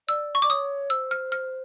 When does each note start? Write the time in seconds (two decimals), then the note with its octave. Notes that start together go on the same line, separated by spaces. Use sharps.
0.08 D5 E6
0.35 C#6
0.42 D5 D6
0.50 C#5 D#6
0.90 C5 E6
1.11 F6
1.32 F6